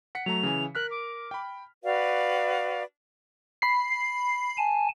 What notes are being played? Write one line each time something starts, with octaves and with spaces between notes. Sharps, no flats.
F#5 B6 C#7
F#3 A3 A#5 F7
C#3 E3 G#5
A#4 F6 F#6 B6
D6
G5 B5
F#4 B4 D5 F5
B5 C7
G#5 A5